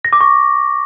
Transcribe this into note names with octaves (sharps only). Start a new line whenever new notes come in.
A#6
D6
C#6